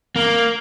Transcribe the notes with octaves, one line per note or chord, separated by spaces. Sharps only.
A#3